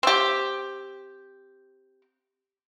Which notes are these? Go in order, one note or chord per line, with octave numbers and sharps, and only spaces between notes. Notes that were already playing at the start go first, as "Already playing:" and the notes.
C4 G4